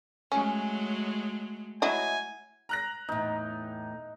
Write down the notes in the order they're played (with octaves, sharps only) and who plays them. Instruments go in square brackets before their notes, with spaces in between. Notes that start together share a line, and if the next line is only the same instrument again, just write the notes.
[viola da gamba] F#3 G#3 A3 [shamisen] C#4
[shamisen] F#3 E4 D#5 [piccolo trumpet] G#5
[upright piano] A#5 F#6 A#6
[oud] E2 A2 [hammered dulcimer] D#4